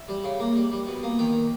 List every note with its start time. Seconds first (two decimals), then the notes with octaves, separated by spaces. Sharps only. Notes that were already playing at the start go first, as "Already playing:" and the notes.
Already playing: E5
0.08 G3
0.24 C#3
0.40 A#3
0.56 G3
0.72 G3
0.87 B2
1.03 A#3
1.19 D#3 G5